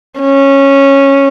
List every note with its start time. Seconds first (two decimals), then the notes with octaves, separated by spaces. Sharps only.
0.20 C#4